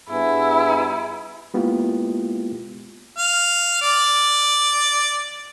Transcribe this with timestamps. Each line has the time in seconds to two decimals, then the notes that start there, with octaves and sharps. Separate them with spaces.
0.11 G2 B3 E4 G#4
1.54 G#3 A#3 B3 E4 F4 G4
3.18 F5
3.82 D5